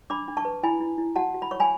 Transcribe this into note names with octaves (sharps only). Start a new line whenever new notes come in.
D4 B5 D6
D4
A5 C#6
B4
E4 G#5 B5
E4
E4
F#4 F#5 A5
F#4
B5
C#5 C#6
G#5 B5